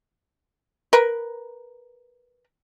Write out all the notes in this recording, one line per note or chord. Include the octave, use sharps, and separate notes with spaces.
A#4 B4